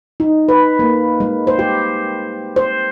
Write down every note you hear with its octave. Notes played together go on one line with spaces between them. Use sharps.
D#4
B4
A#3
G#3
C5
G4
C5